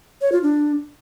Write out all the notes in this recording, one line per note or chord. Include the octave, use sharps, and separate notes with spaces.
C#5
F4
D4